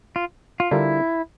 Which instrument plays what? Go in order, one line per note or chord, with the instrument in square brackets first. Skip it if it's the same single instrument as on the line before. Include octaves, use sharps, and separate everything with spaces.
[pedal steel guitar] F4
F4
[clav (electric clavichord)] D3 G3 D4 F4 A#4 [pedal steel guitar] E4